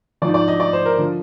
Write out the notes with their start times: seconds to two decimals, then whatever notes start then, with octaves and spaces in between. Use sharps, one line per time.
0.22 F3 D5
0.26 G#2
0.34 D5
0.48 D#5
0.60 D5
0.73 C5
0.85 A#4
0.98 D3 F3